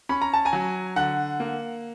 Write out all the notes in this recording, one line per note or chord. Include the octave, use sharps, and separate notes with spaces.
C#4 B5
A#5
A5
G#5 A#5
F#3
D3 F#5
A#3